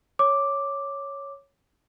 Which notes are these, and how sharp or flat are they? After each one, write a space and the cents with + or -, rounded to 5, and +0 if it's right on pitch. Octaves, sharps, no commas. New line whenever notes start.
C#5 +0 D6 +0